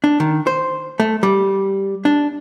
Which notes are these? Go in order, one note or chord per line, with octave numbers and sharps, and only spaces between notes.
D4
D#3
C5
A3
G3
D4